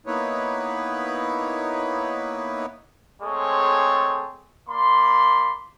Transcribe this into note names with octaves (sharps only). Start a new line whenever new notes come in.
A#3 B3 D#4 E4 B4 C#5
G#3 A3 C4 G#4 A4 C#5
A#3 D5 B5 C6